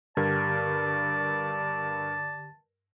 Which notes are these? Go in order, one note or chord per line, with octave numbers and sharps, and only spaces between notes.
G2 D3 G4 A#4 D5 A5 G#6